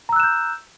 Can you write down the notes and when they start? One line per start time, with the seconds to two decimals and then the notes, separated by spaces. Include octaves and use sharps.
0.09 A#5
0.13 E6
0.16 F#6
0.20 E7
0.23 G6